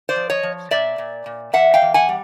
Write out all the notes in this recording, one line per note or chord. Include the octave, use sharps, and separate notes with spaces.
C5 D5
F3
C#5 D#5
F3
A#2 D5 E5
A#2
A#2
E2 E5 F#5
F5 G5
E2
F#5 G#5
G3